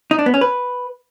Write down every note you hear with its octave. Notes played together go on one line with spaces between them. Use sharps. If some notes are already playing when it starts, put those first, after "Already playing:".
D#4
D4
B3
C#4
B4